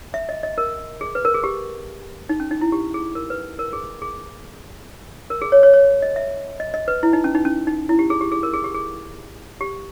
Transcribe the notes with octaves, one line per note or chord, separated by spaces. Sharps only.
E5
D#5
D#5
A#4
G#4
B4
A#4
G#4
G4
D#4
C#4
D#4
E4
G4
G#4
A#4
B4
A#4
G#4
G#4
A#4
G#4
C#5
C#5
C#5
D#5
E5
D#5
D#5
B4
E4
D#4
C#4
D#4
C#4
D#4
E4
G4
G#4
G4
G#4
A#4
G#4
G4
G#4
G4